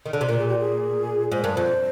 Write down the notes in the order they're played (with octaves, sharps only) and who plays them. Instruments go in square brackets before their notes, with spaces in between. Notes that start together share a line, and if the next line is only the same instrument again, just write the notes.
[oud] D#3
D3
C3
[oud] A#2 [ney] A#4
[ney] G#4
G4
G#4
[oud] G#2 [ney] C5
[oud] G2 [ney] A#4
[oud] F2 [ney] C5